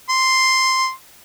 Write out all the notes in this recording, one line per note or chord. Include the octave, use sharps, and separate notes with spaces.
C6